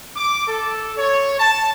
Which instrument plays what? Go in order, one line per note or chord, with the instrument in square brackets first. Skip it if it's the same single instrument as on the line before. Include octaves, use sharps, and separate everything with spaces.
[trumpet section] D6
A4
C#5
A5